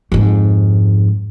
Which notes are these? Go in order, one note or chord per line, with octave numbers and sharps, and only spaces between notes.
F2 G#2